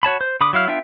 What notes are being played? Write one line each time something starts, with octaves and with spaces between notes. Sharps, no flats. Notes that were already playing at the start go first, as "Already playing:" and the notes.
F#4 C#5 A5 B5
C5
D3 B5 D6 D#6
F#3 E4 F5 F6
B3 D4 F4 E5 G5